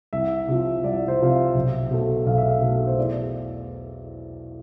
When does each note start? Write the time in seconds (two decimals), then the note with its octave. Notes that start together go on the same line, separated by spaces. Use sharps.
0.13 C2 E5
0.48 C3 F3
0.84 C2 D5
1.08 C5
1.20 C3 F3 F5
1.32 E5
1.55 B1
1.91 B2 A3
2.26 B1 F5
2.38 E5
2.49 F5
2.61 B2 A3
2.87 C5
2.97 E2 D5